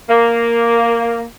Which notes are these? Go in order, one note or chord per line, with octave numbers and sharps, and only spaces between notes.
A#3